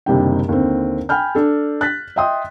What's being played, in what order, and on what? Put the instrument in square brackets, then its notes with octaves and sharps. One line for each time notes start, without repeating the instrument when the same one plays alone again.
[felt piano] F#1 C3 D#3 G3 D4 G5
D#2 D3 C4
G5 G#5 B5 F6 G6
D4 A4
F#6 A6 B6
D#5 E5 G5 C6 D#6